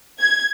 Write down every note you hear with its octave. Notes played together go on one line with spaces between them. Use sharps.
G#6